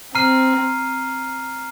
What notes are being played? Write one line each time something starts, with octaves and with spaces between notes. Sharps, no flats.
C4 A#5 F6 C7 D#7